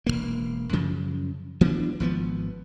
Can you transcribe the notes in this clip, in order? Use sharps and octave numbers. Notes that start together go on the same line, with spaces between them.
E1 F#2 A#3
F#2 C#3 F3
E3 B3 C#4 D4
G#1 F3 B3